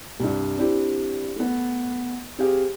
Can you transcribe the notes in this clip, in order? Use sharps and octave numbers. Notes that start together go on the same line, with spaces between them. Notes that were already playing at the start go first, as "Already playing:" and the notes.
C2 G2
C4 D4 E4 G4
A3 B3
C4 G4 G#4 F5